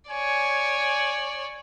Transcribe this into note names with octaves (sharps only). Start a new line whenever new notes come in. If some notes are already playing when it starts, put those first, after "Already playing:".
C#5 D5 G#5